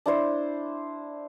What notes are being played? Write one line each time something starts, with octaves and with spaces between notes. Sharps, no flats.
D4 E4 C5